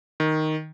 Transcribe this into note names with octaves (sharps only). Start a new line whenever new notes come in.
D#3